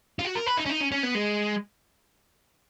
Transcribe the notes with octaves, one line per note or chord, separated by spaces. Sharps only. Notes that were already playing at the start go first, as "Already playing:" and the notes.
F4
F#4
A#4
B4
D#4
C#4
D#4
C#4
C#4
B3
G#3